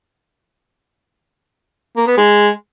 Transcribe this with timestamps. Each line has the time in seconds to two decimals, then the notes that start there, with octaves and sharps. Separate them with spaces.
1.97 A#3
2.07 B3
2.18 G#3